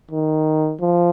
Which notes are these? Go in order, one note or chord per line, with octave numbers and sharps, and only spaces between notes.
D#3
F3